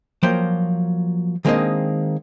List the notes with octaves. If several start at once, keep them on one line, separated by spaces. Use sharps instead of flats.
F3 F#3 A#3 C5 G5
D#3 G#3 A#3 C4 D4 D#5